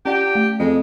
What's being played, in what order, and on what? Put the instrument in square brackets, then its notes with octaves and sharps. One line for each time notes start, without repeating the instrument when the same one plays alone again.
[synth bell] C#4 D5 F#5 [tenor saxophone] G4
[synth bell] A3
[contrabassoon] F2 [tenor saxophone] G#3